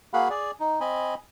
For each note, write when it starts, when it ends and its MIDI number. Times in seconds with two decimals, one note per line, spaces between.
0.14 0.29 58
0.14 0.29 66
0.14 0.29 68
0.14 0.29 77
0.14 0.29 78
0.14 0.29 83
0.30 0.51 68
0.30 0.51 74
0.60 0.80 63
0.80 1.15 60
0.80 1.15 75
0.80 1.15 80
0.80 1.15 83